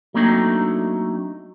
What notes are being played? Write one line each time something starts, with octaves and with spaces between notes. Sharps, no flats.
F#3 A3 A#3 C4 D4 D#4